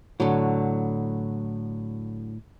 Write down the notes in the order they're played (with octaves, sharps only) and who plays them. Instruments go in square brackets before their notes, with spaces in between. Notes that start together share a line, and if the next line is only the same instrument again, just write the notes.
[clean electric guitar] A2 [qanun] D3 F#3